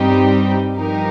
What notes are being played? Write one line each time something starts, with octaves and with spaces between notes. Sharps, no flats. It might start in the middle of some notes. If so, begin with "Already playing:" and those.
Already playing: G2 G3 C4 D#4 G4
G2 F3 D#4 G4 A#4